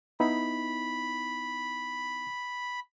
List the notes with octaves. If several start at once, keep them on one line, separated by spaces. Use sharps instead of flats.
B3 D#4 E4 B5